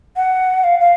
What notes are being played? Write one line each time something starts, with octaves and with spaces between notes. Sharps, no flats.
F#5
F5
F5